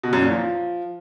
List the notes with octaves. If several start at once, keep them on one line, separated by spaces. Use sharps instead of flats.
B2
F#2
A#2
F3